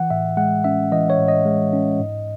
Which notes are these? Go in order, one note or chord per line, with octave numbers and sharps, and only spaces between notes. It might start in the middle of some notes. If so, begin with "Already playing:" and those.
Already playing: E3 F#5
A2 E5
G#3 F#5
C#4 E5
E3 D#5
C#5
A2
D#5
G#3
C#4
G#2